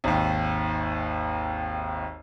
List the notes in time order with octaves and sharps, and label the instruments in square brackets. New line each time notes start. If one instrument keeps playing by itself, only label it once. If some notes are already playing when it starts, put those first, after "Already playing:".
[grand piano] G#1 D#2